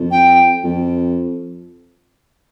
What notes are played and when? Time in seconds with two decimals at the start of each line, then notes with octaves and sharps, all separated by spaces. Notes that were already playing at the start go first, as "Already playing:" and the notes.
Already playing: F2
0.11 G5
0.64 F2